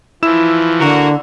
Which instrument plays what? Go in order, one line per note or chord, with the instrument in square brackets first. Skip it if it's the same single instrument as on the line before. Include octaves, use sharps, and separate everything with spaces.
[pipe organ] E3 F3 [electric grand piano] E4 E6 E7
[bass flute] D3 [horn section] A#3 F#4